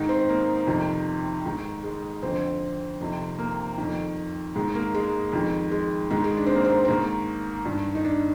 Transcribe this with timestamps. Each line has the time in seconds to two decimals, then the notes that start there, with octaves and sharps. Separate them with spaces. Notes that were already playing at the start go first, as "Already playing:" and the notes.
Already playing: G#2 D#3 D#4
0.09 C4
0.29 A#3
0.67 F2 C3 D#3
1.46 G#2 D#3
1.84 G#3
2.23 F2 D3 C4
3.01 F2 C3 D#3
3.39 A#3
3.78 F2 D#3
4.55 G#2 D#3 G#3
4.75 A#3
4.95 G#3
5.33 F2 D#3
5.72 G#3
6.11 G#2 D#3 G#3
6.24 G#3
6.37 D4
6.46 C4
6.56 A#3
6.65 C4
6.85 C4
6.88 G#2 D#3 A#3
7.65 G2 D#3
7.95 D#4
8.05 D4